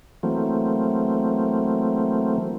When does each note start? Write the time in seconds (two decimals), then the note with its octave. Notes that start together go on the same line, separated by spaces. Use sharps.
0.23 E3 F#3 A3 A#3 C4